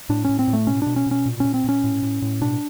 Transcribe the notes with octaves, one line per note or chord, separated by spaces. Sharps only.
A2 D4
A2 C#4
C4
A2
A3
B2 C#4
B2 D4
C#4
B2 C#4
A#2
A#2 C#4
C4
A#2 C#4
A2
A2
A2
B2 D4